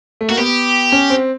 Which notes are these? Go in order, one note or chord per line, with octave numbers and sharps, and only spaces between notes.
A3
A#3 F#4
B3 G4
C#4
C4